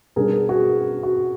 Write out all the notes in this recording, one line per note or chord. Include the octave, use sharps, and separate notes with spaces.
B2 G3 B3 D4 G#4 A#4
F#4 G#4
F#4